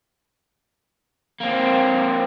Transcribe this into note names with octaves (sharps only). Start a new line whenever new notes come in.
A#3 C4